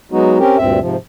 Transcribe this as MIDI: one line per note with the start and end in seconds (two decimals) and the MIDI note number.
0.12 0.38 54
0.12 0.38 56
0.12 0.38 59
0.12 0.38 63
0.12 0.38 66
0.39 0.58 60
0.39 0.58 61
0.39 0.58 67
0.39 0.58 70
0.58 0.79 38
0.58 0.79 43
0.58 0.79 46
0.58 0.79 60
0.58 0.79 76
0.80 0.96 44
0.80 0.96 48
0.80 0.96 53